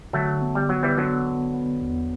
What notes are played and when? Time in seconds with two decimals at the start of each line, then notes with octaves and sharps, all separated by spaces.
0.13 D3 F#3 A3
0.42 B3
0.55 G3
0.69 F#3 B3
0.83 E3 G3
0.98 D3 F#3 B3
1.26 B3
1.54 B3
1.81 E2